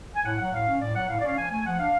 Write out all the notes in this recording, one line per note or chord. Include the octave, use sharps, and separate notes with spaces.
G#5
A2 F#5
F#3 F#5
A2 F5
C#4
A2 D5
F#3 F#5
A2 F5
D5
C#4 F5
F3 G#5
A3 G#5
F3 F#5
D4 F5